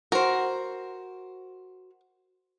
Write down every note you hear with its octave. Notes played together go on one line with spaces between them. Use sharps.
F#4 A#4 C5